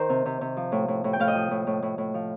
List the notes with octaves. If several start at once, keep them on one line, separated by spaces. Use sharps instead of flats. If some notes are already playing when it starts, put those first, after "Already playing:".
Already playing: D#3 A#4 C5
C3
C3
C3
F3
A2
A2
A2
G5
A2 F5
D#5
F3
A2
A2
A2
A2
F3